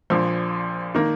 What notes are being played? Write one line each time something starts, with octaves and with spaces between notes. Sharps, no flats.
A#1 A#2 F3
D#3 A#3